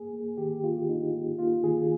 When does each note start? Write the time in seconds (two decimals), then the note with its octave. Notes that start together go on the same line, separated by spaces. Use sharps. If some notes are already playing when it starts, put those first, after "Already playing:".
Already playing: A#3 G#4
0.13 A#3
0.37 D#3 G4
0.63 A#3 F4
0.88 A#3 D#4
1.14 A#3
1.39 A#3 F4
1.64 D#3 G#4